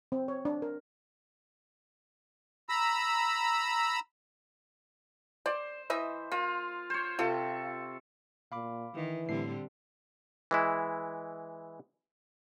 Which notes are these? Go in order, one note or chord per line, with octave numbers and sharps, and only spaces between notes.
C4
C#5
D4
A#4
A#5 B5 E6
C5 D5
E3 D#5 E5
A#3 F4
C5 C#5
C3 F4 A4 C#6
A#2 F5 B5 D6
D#3 E3
A2 D3 G3 C4 C7
E3 G#3 E4